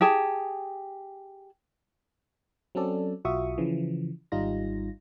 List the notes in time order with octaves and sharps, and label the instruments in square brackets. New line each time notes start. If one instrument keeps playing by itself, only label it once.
[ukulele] G4 G#4 A5
[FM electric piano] F#3 C4 C#4 A4 D5
B1 F4 F#4 E5 C#6 D#6
C#3 E3 F3
G#1 G3 D#4 F4 A#6